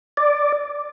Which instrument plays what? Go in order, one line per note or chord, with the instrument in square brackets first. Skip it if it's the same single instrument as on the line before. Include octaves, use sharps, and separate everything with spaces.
[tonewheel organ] D5